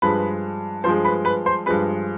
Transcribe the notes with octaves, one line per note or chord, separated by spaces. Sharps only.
G2 F3 G#3 B4 B5
G2 F3 G#3 C5 C6
B4 B5
B4 B5
C5 C6
G2 F3 G#3 B4 B5